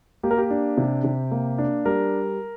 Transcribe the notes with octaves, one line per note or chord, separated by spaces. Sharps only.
A#3 G4
A#4
G4
D4
C3
C3
A#3
D4
G3 A#4